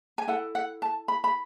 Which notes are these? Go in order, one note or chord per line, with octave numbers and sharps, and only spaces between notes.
G#5
E4 A4 F#5
F#5
A5
B5
B5